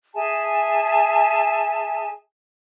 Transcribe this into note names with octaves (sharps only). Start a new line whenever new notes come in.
G#4 E5 G#5 A5